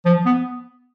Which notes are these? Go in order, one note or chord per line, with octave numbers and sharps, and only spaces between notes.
F3
B3